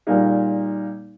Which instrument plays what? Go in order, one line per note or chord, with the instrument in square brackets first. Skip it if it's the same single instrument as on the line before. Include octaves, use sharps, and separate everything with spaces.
[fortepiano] A#2 G3 A#3 D#4 G#4